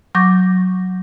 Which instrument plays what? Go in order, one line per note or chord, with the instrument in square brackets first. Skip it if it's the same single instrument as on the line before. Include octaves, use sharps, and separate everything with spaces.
[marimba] F#3 C#6 D6 G6 A#6